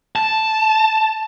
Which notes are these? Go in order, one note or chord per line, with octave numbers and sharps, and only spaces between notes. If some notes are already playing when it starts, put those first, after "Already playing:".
A5